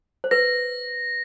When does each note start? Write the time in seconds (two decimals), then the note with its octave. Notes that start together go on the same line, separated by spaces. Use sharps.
0.24 C5
0.31 B4 A#6